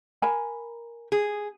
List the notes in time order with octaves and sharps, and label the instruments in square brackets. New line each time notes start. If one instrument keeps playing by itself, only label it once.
[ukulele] A#4 G#5 B5
[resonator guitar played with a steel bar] G#4